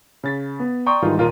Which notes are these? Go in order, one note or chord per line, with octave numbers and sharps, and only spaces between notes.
C#3 A6 B6
B3
D5 G5 A#5 C6 C#6 D#6
G#2 D#3 E3 G3 D#4 F4
D#2 A#2 F4 A#4 D#7